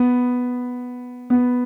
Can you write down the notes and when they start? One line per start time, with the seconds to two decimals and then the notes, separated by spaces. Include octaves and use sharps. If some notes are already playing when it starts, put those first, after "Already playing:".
Already playing: B3
1.30 B3